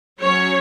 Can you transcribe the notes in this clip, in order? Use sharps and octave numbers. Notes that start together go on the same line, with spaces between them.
F#3 C#4 C#5